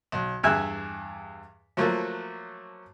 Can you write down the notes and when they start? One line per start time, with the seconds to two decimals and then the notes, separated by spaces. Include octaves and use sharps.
0.12 B1
0.43 E2 G2 G#4 E5 G#5 F#6
1.77 F3 F#3 A3 A#3